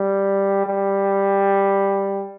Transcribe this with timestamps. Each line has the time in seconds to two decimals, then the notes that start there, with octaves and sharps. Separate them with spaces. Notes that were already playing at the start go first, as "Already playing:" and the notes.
Already playing: G3
0.66 G3